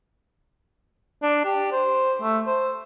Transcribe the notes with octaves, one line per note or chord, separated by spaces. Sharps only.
D4
G4
C5
A3
C5